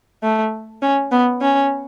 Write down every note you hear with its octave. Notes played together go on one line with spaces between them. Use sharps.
A3
C#4
B3
C#4